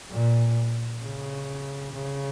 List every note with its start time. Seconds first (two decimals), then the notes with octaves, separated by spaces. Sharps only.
0.11 A#2
1.02 C#3
1.94 C#3